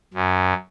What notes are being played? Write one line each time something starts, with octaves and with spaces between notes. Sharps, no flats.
F#2